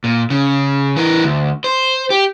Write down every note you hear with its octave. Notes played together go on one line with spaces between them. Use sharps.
A#2
C#3
E3 A#4
D2
C5
G4